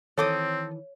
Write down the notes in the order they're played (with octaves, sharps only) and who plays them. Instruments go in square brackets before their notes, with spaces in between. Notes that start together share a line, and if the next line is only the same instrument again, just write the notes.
[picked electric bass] D#3 E3 [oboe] C4 [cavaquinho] A4 D6 D#6 [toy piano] C#5